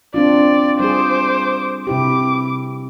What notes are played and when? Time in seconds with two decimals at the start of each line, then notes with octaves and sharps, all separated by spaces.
0.14 C4 D4 F4 D5
0.80 G3 F4 G#4 C5 D6
1.87 C3 E4 G4 D6